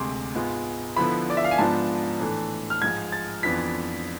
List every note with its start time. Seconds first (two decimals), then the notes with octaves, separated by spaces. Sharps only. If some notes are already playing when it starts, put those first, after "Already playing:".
Already playing: D2 C3 G#3 C6 D6
0.35 G#2 G#3 B3 F4
0.96 D3 F3 B3 E4 B5
1.30 D5
1.37 E5
1.44 F5
1.51 G#5
1.58 G#2 F3 B3 D4 F4 A5
2.20 A2 E3 A3 D4
2.70 F6
2.82 G#2 F3 G#3 G#6
3.12 A6
3.43 F2 E3 B3 D4 F4 B6